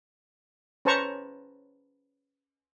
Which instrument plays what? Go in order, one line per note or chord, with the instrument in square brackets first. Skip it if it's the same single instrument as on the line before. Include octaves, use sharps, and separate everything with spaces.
[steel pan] C#4 B4 C5 A5 A#5 C#6